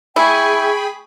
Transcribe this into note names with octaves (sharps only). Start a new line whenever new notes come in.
E4 G#4 G5 G#5 B5 C#6